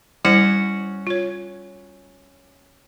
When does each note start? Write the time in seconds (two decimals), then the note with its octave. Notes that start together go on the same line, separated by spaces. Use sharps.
0.25 G3 C#4 E4 F#4 C5 F#5
1.07 F4 C#5